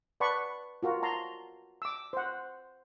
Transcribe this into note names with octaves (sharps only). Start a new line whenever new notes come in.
B4 D5 F#5 A5 B5 C#6
F4 F#4 A#4 A#5
A5 A#5 C6
D6 E6
C5 F#5